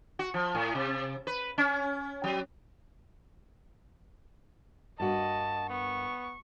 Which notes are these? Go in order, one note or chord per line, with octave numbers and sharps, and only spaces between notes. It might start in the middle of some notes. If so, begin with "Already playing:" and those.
F#4
F3
A2
C3
B4
C#4
F#3
G2 A#3 F#4 D#5 A5
B3 C#6